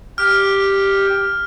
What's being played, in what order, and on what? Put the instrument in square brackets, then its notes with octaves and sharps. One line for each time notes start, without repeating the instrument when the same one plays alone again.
[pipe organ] G4 [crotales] F6